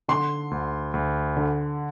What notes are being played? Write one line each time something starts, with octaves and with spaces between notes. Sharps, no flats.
D3 C6
D2
D2
D3